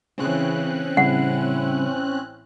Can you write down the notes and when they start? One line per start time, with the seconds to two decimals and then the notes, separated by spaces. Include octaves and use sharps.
0.18 C#3 E3 C4 C#4 F#6
0.97 A1 C#3 G3 E4 F#5